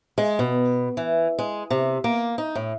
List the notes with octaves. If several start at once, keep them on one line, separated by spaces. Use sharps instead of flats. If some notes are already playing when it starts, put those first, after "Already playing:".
G#3
B2
E3
G#3
C3
A#3
D#4
A2